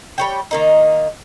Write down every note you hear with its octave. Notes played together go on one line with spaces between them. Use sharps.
G3 C#5 G5
D#3 A#3 D#4